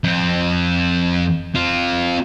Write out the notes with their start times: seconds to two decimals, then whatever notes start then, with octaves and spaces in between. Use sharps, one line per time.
0.04 F2 C4
1.55 C4 F4